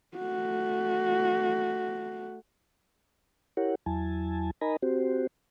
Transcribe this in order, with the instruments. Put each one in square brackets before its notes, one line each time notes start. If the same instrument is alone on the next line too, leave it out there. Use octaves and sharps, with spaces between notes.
[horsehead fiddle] A3 F#4
[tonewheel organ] E4 G4 A#4 C#5 F#5
E2 F#3 E4 G#5 A5
D#4 A#4 D#5 G#5 A#5 B5
C4 F#4 G4 C5